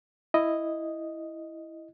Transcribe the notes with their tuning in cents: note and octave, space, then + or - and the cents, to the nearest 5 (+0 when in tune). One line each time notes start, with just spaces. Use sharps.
E4 +0 D#5 +0